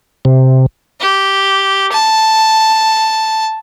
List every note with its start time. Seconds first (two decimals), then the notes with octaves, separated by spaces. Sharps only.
0.25 C3
1.00 G4
1.91 A5